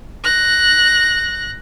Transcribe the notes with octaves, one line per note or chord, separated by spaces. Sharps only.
F#6 A#6